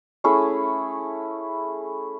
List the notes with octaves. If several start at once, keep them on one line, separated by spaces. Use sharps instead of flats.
A3 C#4 E4 G#4